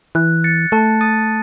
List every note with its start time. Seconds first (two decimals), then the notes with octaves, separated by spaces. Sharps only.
0.15 E3 F#6
0.44 A6 C#7
0.72 A3 A5
1.01 D#6 A6 D#7